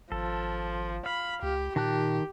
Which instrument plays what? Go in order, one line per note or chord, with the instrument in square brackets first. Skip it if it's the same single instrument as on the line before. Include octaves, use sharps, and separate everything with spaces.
[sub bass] G#1 [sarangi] F3 [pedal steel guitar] A4
[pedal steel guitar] F5 [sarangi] B5
[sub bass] C#2 [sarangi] G4
[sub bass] A#2 [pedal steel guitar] D#3 A5 F#6 [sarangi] G4